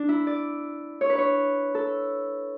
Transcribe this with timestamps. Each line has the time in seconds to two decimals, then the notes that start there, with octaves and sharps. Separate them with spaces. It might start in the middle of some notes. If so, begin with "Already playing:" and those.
Already playing: D4
0.09 E4
0.27 D5
1.01 C#5
1.10 B4
1.18 C#5
1.75 A4